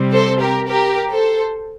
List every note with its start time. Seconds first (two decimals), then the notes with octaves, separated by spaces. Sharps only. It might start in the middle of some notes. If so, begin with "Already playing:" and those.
Already playing: C3 G3 C4
0.12 A4 C5
0.40 G4 A#4
0.68 G4 A#4
1.11 A4 C5